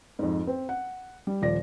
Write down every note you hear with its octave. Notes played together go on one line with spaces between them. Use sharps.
F2 G#2
C4
F#5
G3
D#1 F3 D5 A#6